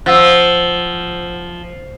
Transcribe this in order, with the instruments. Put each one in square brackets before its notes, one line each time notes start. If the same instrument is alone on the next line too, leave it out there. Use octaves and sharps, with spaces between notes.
[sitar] F3 [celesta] C5 F#5 E6